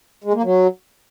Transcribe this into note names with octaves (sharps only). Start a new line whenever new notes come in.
G#3
A#3
F#3